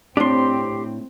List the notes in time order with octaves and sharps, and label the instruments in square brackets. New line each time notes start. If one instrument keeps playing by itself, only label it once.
[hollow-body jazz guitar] A2 D4 [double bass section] C4 [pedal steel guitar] G4 C6